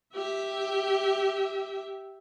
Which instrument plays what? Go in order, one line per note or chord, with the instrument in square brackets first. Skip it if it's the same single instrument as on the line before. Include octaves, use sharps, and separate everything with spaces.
[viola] G4 E5